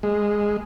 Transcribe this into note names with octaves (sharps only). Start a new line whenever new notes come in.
G#3